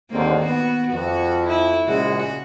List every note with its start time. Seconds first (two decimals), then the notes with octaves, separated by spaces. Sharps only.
0.10 D#2 G#2 D3 D#3 A#3 C4
0.45 B3 F#4
0.93 F2 F#4
1.47 E4
1.86 A#1 C#3 G#3 F#4